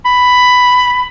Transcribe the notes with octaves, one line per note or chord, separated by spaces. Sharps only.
B5